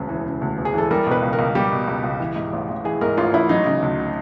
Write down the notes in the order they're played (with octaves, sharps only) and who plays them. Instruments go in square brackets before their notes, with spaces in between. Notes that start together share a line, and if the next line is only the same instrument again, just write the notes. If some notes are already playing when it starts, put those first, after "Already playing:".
Already playing: [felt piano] E1 D2 C#3
E3
C#3
D2
E1
G#4
E3 A4
G3 A#4
B2
B4
C#2
A#4
C#2
G3 G4
B2
C#2
C#2
E3
G#2
A1
A1
E3 G#4
G#2 A#4
A1 F4
A1 E4
F#3 D#4
C#3
D2